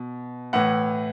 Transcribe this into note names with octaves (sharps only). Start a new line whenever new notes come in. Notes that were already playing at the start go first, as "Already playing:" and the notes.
Already playing: B2
A2 E3 F#5